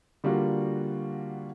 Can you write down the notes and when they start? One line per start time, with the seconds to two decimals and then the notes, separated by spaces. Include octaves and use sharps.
0.24 D3 G3 A#3 F4 F#4